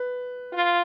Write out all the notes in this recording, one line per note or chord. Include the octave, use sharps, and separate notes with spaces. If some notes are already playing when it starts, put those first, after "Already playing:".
Already playing: B4
F4